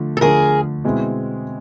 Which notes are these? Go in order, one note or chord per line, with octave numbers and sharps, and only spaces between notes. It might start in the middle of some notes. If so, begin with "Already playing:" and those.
Already playing: D3 F3 A3
A4
D3 F3 A3 G#4 A#4
B2 G#3 C4 E4